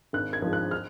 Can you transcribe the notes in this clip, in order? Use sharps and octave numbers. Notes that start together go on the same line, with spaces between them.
G#1 F#6
G#6
G#2 F3
F#6
F6